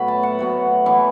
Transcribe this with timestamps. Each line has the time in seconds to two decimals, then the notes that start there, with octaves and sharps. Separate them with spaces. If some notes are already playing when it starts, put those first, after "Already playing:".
Already playing: A2 F#3 B3 B5
0.08 A5
0.23 F#5
0.39 A2 F#3 B3
0.86 E3 B3 E4